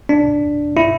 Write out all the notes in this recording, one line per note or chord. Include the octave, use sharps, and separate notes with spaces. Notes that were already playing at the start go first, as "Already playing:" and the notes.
D4
E4